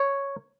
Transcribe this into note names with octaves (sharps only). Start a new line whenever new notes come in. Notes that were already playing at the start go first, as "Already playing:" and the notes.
Already playing: C#5